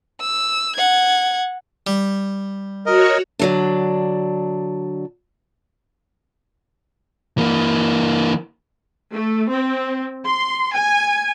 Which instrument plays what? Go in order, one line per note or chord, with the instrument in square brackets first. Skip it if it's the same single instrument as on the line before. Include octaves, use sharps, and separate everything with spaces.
[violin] E6
F#5 G#6
[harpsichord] G3
[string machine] F#4 C#5 [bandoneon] A#4 D#5
[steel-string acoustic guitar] D3 F#3 D4
[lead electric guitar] E3 A#3
[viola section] A3
C4
C6
G#5